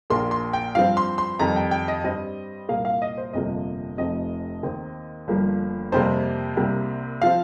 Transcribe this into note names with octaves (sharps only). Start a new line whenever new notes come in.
A#1 A#2 A#3 C6
C6
G5
G2 F3 C4 F5
C6
C6
F2 D#3 G3 A#5
G5
G5
D#5
G2 G3 C4 D#5
C2 A#2 A#3 F5
F5
D#5
C5
G1 F2 C3 F3 A#3 D#5
F1 F2 C3 F3 C4 D#5
D#2 D#3 C4
G1 G2 F3 A#3
F2 C3 G3 A#3 C5
C2 C3 G3 A#3
F3 C4 F5